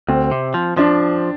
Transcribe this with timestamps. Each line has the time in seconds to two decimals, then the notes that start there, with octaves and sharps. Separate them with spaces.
0.08 D2 C4
0.32 C3
0.54 F3
0.77 F3 D4